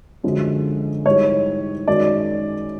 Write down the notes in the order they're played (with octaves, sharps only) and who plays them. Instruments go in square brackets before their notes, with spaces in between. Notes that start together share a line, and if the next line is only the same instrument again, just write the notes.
[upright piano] F#2 D3 F3 G#3
G#2 E3 G3 C#5
F#2 D#3 G#3 D5